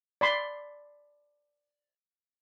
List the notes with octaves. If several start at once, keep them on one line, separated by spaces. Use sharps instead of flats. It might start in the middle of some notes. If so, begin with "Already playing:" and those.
D5 B5 C6